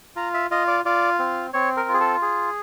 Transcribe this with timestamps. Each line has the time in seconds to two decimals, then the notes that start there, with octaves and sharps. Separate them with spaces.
0.16 F4 A#5
0.34 E5
0.51 F4 D#5
0.68 D5
0.85 F4 D5
1.19 C4
1.53 C4 C#5
1.77 A#4
1.89 F4
1.94 G#4
2.00 A4
2.22 G#4